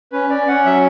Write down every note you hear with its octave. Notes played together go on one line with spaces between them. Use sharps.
C#4 B4
C#4 D5
C#4 F#5
F#3 E5